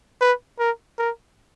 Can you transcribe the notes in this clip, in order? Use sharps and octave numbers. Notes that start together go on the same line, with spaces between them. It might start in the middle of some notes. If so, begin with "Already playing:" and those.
B4
A#4
A#4